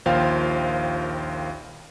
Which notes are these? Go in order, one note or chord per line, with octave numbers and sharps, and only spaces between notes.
A#1 D#2 F4 C5 F5 G5